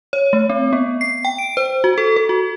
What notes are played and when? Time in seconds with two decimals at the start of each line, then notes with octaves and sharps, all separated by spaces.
0.13 C#5
0.33 A3
0.50 C4
0.73 B3
1.01 C7
1.25 G5
1.38 D7
1.57 C5
1.84 F#4
1.98 A4
2.16 A4
2.29 F#4